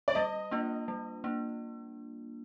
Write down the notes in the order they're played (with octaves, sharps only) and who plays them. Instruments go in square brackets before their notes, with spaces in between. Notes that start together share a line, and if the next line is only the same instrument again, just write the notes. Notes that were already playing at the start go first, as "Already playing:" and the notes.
[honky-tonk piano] D5
[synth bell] G3 [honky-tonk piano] D#5
[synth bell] A#3 D4 F4
G3
A#3 D4